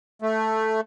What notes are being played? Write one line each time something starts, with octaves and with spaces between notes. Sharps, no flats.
A3